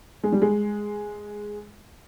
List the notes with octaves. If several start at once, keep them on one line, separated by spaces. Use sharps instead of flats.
G#3
G3
G#3